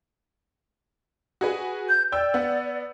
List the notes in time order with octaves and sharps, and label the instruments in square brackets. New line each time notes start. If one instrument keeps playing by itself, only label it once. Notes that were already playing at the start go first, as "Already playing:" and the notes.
[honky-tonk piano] F#4 G#4 B4
[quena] G6
[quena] D5 [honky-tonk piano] G5 E6 G6
[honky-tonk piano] B3 F#5